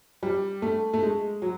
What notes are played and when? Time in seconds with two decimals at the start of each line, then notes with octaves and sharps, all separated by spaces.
0.23 G3
0.62 A3
0.93 A3
1.03 G#3
1.42 F#3